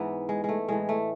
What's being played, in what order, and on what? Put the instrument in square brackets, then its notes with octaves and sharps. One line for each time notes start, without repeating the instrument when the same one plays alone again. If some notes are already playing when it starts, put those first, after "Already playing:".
Already playing: [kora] G#2 E3 B3
G#3
G#3 A3
A2 E3 G#3
A3